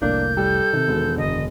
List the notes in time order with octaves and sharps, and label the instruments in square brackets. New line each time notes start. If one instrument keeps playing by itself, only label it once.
[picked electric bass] F1 C2 A2 [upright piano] A#3 [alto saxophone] D4 [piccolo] G6
[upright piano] G3 [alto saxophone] A4
[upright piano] C3 [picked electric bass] D#3
[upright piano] E1
[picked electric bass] F#1 D3 [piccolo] D#5